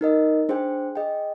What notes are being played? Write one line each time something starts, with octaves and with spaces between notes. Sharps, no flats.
D#4 A#4 D#5
D4 G#4 C5 G5
G#4 D#5 G5